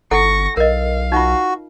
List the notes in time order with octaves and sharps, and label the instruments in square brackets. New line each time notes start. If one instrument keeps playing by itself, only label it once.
[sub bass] G1 [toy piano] E4 A4 F#5 [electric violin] C#6 A#6
[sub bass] B1 [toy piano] A#4 D#5 [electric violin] F5
[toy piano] D#4 F4 [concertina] F#4